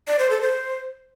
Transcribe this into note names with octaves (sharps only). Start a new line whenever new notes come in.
D5
C5
A4
C5